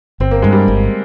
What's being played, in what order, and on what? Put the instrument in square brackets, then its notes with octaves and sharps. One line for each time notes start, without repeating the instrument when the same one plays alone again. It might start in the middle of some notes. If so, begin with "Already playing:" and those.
[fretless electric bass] G1 [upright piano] C4
[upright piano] A#3
[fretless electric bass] G2 [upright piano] G#3
[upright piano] G3 A#3
[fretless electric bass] G1